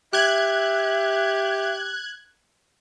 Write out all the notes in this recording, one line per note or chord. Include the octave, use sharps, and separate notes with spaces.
G4 E5 F#6 G#6